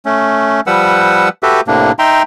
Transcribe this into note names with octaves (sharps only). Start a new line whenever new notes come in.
A3 C#4
F3 G3 B4 F#5 E6
F#4 G4 A4 B4 E5
A2 C3 A#3 D4
D#4 E5 G5 A#5 C6